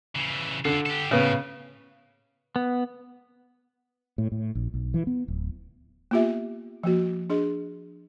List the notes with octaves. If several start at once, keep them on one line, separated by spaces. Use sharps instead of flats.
C#3 E3
D3 F4 A4
G4 A4
A2 C#3 B3
B3
A2
A2
A#1
B1
E3
B3
D1
A#3 B3 F4 G4 E5
F3 A#3 F#4
D4 G#4 D#5